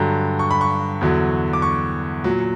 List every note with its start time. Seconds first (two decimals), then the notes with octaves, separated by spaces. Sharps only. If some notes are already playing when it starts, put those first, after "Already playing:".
Already playing: G2 D3 F#3 A#5
0.39 C#6
0.51 B5
0.61 C#6
1.01 E2 D3 F#3
1.53 D6
1.62 C#6
2.24 A#2 F#3